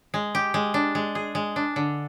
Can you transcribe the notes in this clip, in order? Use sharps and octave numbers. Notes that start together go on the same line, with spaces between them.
G#3
G4
G#3
D4
G#3
G#4
G#3
D4
D3